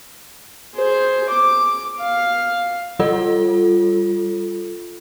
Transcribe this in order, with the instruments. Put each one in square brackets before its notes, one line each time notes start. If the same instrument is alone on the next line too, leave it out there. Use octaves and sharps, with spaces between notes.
[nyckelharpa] G#4 C5
D6
F5
[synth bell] G3 F4 A4